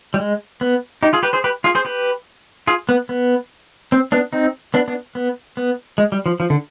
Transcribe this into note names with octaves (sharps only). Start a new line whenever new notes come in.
G3
G#3
B3
D#4 G4
F4 G#4
G4 B4
G#4 C5
G4 B4
F4 G#4
G#4 C5
G4 B4
F4 G#4
B3
B3
C4
B3 D4
C4 D#4
B3 D4
B3 D4
B3
B3
G#3
G3
F3
F3
D3